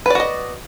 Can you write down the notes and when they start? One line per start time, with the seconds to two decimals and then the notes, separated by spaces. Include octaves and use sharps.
0.06 B4
0.10 D5
0.15 F#4
0.20 D#5